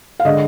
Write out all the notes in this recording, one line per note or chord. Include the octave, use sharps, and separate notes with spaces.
F5
D3 G#3 D#5